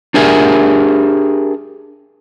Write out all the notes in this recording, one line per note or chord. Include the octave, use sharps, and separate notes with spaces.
D4 G4 G#4 A#4 E5 G#5